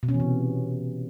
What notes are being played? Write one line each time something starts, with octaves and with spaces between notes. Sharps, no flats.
B2
C#4
E3
C3